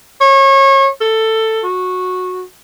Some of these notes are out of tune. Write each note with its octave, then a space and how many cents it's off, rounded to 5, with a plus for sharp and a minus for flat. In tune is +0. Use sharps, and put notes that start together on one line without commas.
C#5 -30
A4 +10
F#4 -15